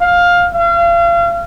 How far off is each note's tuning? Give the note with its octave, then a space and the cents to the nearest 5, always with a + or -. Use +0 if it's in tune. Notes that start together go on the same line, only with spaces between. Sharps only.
F5 +15
F5 -35